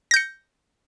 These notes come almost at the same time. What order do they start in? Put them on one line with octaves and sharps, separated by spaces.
A#6 G6 C#7